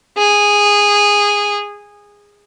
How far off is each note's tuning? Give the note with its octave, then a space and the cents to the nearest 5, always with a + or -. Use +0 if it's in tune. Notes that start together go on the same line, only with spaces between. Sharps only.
G#4 -15